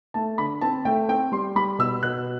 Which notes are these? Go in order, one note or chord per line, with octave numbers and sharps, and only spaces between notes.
A3 A5
D3 B5
C4 A5
A3 G5
C4 G5
G3 C6
G3 B5
B2 E6
B2 F#6